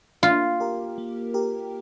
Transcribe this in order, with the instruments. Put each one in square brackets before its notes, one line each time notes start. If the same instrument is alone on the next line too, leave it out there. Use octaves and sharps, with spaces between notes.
[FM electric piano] A#3 [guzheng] F4
[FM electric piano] G4 A#4
A#3
G4 A#4